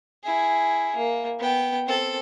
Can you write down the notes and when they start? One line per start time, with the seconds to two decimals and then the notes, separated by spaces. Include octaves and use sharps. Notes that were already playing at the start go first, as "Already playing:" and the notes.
0.23 E4 G#4
0.96 A#3
1.40 B3 G5
1.87 C4 A4